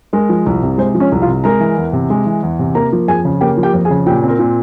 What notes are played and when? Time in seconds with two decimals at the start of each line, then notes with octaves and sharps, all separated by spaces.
0.13 G#3 A#4
0.29 F3
0.46 C2
0.63 C3
0.78 G#3 C5
0.94 F3
1.00 C#4 C#5
1.12 C2
1.22 F4 F5
1.27 C3
1.44 G#3 A#4 A#5
1.60 E3
1.78 E2
1.93 C3
2.10 G#3
2.26 E3
2.43 E2
2.59 C3
2.75 A#3 A#4 A#5
2.93 F3
3.08 F2 G#4 G#5
3.25 C#3
3.41 A#3 G4 G5
3.57 F3
3.63 G4 G5
3.74 F2
3.85 G#4 G#5
3.91 C#3
4.06 A#2 G4 G5
4.23 C4
4.28 A#4
4.39 A#2